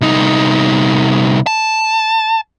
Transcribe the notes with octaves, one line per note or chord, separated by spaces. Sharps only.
C2 D#4
A5